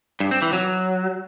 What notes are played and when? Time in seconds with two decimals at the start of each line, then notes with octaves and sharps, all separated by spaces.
0.20 G2
0.31 C4
0.42 E3
0.53 F#3